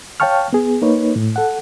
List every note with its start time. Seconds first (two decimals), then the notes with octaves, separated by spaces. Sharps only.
0.20 C#5 F5 G5 A5 C#6 F6
0.53 B3 G#4
0.82 A#3 D#4 B4 C#5
1.16 A2
1.36 A4 F#5